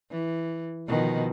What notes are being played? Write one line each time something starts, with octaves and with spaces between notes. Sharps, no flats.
E3
B2 D#3 F3